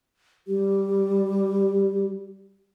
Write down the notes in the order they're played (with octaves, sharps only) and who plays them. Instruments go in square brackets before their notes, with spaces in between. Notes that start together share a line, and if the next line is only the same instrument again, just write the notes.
[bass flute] G3 [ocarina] G4